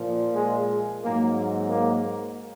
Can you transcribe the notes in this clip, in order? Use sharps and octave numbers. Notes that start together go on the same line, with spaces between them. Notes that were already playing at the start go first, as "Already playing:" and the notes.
Already playing: A#2 F3
G#3
G#2 F#3 A#3
A#3